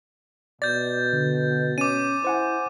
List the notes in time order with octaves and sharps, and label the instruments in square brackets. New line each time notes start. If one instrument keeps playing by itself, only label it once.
[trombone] B2 [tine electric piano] D5 [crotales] G6 A6
[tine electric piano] D3
[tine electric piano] C#4 [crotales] D6 D#7
[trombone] E4 [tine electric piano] C5 F#5 G#5